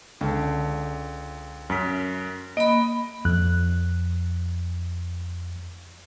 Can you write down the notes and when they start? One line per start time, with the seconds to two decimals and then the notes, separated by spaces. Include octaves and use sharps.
0.21 C#2 D3
1.70 F#2 B6
2.57 A#3 D#5 B5
3.25 F2 F#6